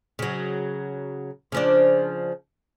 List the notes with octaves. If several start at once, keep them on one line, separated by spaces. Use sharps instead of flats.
C#3 F#3
C#3 F3 D4